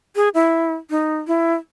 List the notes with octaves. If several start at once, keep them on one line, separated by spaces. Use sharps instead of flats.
G#4
E4
D#4
E4